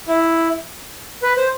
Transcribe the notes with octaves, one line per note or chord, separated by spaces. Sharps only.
E4
B4
C5